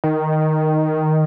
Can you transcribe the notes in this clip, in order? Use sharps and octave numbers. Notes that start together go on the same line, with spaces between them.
D#3